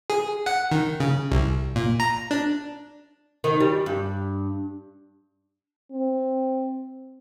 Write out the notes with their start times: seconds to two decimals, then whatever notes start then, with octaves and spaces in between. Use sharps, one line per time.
0.10 G#4
0.46 F#5
0.72 D#3
1.00 C#3
1.31 C2
1.76 A#2
2.00 A#5
2.31 D4
3.44 D#3
3.60 G3
3.86 G2
5.91 C4